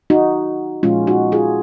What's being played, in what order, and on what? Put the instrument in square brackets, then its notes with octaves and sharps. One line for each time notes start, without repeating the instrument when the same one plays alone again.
[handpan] D#4 F#4
A#2 F3 G#3 C#4 F4
D#4 F#4
F4 G#4